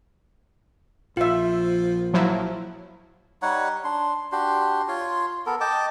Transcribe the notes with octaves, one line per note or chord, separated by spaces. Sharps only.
A#1 F3 F4 E5
F3 F#3 E4
G3 D#4 C#5 F#5
D4 C6
D4 F#4 G4 C6
F4 C#5 C6
B3 A4 A#4
D#5 G5 A5 D6